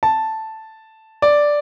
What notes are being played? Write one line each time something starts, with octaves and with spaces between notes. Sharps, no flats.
A5
D5